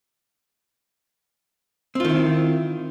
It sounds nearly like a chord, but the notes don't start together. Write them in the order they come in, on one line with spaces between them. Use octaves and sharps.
C4 F4 D#3 E4